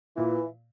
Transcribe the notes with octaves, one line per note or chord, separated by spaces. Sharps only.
A#2 E3